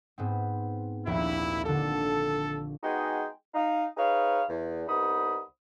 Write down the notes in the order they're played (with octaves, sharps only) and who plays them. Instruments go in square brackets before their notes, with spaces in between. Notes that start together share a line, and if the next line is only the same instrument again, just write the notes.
[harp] G#2 B3 C4
[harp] A#1 D#2 [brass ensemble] E4
[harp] D3 D4 [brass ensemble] A4
[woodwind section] G#3 B3 D#4 F#4 G#4 G5
D#4 F5
D#4 G#4 B4 C#5 F5
E2
C2 B3 D#4 B5 D#6